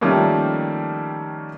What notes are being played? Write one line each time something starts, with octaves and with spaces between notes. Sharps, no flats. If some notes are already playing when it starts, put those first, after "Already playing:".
D#3 F3 G3 A3 A#3 C#4